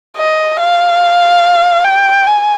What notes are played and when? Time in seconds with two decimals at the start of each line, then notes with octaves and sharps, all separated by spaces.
0.17 D#5
0.59 F5
1.84 G5
2.27 G#5